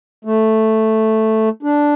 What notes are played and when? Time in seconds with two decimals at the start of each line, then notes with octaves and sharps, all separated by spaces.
0.25 A3
1.63 D4